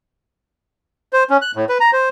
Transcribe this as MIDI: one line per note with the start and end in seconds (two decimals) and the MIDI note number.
1.13 1.24 72
1.30 1.37 61
1.42 1.52 90
1.56 1.65 45
1.69 1.78 71
1.80 1.91 82
1.93 2.09 72